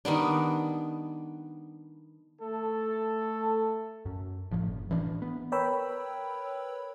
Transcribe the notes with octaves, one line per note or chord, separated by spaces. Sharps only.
D#3 G3 B3 D4
A3 A4
F#2
A1 F3
F#1
A1 E3 B3 D4
B3
A#4 B4 C#5 G5 B5 E6